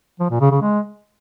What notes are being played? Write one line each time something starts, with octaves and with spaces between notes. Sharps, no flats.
F3
A#2
C#3
C#3
G#3